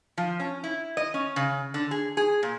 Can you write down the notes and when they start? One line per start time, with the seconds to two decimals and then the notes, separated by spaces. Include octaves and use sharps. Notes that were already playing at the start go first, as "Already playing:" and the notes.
0.18 F3
0.40 C#4
0.64 E4
0.97 D#5
1.14 C#4
1.36 C#3
1.74 D3
1.91 G#4
2.17 G#4
2.43 A#2